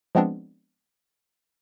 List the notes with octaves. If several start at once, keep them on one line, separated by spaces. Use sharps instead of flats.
F3 G#3 B3 C4 D4